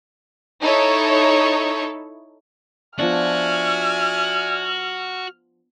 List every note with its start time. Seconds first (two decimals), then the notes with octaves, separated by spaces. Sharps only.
0.62 D#4 E4 A4 C#5
2.99 F3 B3 D4 F#4 D5 E5 G#5 F6